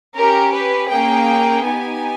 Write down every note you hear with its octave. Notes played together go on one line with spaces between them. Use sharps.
C#4 G4 A#4
B4
A#3 C#4 G#4 G5
B3 D#4 G4 G#5